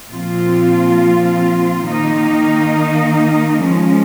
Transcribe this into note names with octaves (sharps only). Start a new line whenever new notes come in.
A#2 F3 C4 F4
D#3 A#3 D#4
F3 G#3 C#4